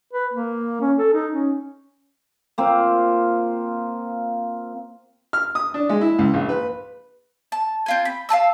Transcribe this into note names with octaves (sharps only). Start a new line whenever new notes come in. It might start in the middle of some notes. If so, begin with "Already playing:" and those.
B4
A#3
C#4
A4
D#4
C#4
A#3 C4 F4
F6
D#6
D4
G#3
E4
C#2
A#1
B4
A5
C4 F4 G#5
B5
F5 G#5 A5 E6